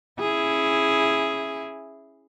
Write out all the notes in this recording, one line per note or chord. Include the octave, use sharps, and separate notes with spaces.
C#4 E4 G#4